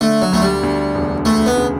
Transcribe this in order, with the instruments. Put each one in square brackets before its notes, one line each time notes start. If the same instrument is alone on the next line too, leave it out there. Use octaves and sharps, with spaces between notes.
[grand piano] D3 [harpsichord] A3
[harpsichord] F#3
[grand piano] D2 [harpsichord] A3
[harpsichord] G3
[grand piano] D2
E1
[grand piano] D2 [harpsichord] A3
[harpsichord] B3
[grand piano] C#3